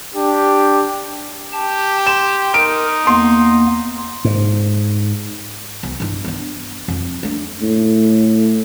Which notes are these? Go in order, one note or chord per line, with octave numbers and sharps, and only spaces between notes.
D4 G4
G4 A5
C6 E7
D#4 A#4 D7
E2 A#3 B3 C6
G#2
B1
G2 E4
B3 D4
F2
A3 D4
A2